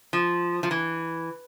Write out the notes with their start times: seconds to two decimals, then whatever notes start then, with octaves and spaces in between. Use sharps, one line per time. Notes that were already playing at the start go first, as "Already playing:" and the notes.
0.13 F3
0.63 F3
0.71 E3